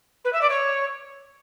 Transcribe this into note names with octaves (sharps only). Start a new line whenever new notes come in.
B4
E5
D5
C#5